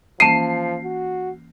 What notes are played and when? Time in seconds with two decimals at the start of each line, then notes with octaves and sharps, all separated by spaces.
0.20 E3 F3 A#3 C#4 A5 C7 D7 D#7
0.84 F#4